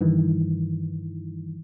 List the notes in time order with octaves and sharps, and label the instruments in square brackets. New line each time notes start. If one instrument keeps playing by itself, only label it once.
[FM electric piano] G2 D#3 E3